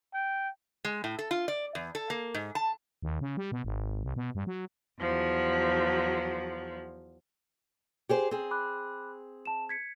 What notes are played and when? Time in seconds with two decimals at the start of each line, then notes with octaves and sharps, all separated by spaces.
0.14 G5
0.85 G#3
1.04 A2
1.19 A4
1.31 F4
1.48 D5
1.75 E2
1.95 A4
2.10 A#3
2.34 G#2
2.55 A5
3.02 D#2
3.21 C#3
3.37 G3
3.52 B2
3.64 G#1
4.03 C2
4.16 B2
4.35 G2
4.47 F#3
4.99 E2 F3 F#3
8.09 G4 G#4 C5
8.31 C4 G#4
8.51 B5 D6 F#6
9.46 A5 E7
9.69 G#6 B6 C#7